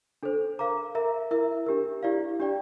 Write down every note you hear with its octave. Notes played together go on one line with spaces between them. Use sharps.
D4 A4 C5
A#4 F5 A#5 D6
A#4 E5 A#5
E4 A#4 E5
D4 G4 A#4
E4 G4 D5 F5
D4 G4 D5 G5